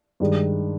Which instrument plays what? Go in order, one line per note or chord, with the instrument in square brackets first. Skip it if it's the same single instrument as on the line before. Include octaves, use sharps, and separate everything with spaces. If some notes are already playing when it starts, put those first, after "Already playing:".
[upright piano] G2 D#3 G#3